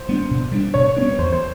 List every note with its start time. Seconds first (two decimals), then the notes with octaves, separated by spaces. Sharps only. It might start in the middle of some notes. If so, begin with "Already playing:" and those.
Already playing: C5
0.09 G3 B3 D4
0.31 B2
0.52 G3 B3 D4
0.74 B2 C#5
0.97 G3 B3 D4
1.18 E2 C5
1.32 C5